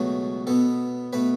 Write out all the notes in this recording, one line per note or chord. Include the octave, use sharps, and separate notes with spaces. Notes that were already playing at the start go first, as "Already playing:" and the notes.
Already playing: C#2 B2 F#3 A3 F#4
B2 B3 A4
B2 A3 B4